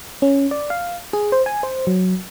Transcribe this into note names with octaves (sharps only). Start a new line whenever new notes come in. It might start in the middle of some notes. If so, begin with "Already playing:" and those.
C#4
D5
F5
G#4
C5
G#5
C5
F#3